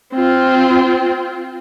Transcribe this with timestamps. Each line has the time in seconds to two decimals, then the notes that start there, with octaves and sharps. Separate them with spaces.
0.14 C4 F4